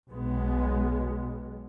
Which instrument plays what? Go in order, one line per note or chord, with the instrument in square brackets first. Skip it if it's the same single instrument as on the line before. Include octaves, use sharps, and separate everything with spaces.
[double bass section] B1 B2 G#3 B3